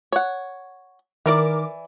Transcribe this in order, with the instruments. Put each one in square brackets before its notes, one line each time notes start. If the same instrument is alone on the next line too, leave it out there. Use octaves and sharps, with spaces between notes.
[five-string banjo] C#5 F#5
[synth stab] D#3 A#4 D6 [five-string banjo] E3 D5